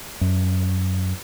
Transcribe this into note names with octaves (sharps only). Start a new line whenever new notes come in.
F#2